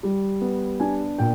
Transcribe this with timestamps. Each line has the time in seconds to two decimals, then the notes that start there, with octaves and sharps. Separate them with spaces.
0.03 G3
0.41 B3
0.80 D4 G#5
1.18 A#2 G5